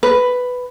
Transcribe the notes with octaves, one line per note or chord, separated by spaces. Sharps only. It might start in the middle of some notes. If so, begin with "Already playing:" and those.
B4